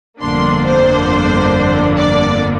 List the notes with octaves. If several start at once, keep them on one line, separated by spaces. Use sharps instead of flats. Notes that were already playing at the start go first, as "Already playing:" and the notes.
G1 F2 D3 A#3 D4 C6
C5
D5